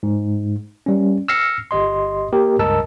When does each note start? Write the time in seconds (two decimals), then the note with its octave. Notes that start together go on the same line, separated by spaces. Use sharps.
0.03 G#2
0.86 G3 C#4
1.28 E6 F6 A#6 C7 C#7
1.71 G1 G4 D#5 C6
2.32 A#3 G4 A#4
2.59 C#2 G2 A#4 D#5 A5 E6